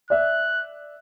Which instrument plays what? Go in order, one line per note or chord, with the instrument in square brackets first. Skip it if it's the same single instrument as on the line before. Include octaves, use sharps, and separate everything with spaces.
[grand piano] D5 E5 [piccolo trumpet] F#6